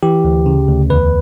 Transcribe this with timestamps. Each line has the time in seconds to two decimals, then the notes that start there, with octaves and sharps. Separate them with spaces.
0.03 E3 G4
0.25 D2
0.46 C#3
0.68 D2
0.90 E2 B4